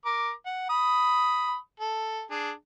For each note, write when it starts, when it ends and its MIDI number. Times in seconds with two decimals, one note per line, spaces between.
0.05 0.31 70
0.05 0.31 86
0.46 0.66 78
0.70 1.56 83
0.70 1.56 87
1.80 2.22 69
2.30 2.51 62
2.30 2.51 68